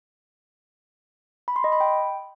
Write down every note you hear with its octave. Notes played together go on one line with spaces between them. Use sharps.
B5
C6
D#5
B5
G5